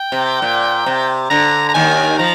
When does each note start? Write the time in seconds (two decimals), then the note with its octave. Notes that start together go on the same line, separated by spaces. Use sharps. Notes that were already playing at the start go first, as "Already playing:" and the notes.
Already playing: G5
0.12 C3
0.42 A#2
0.86 C3
1.30 D3 A#5
1.69 A#5
1.74 D#2 D#3 G#5
2.19 F3 A#5